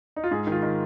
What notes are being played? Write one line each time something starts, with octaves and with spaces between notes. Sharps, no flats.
D#4
F4
G#2 G#4
D#3
F4
D#3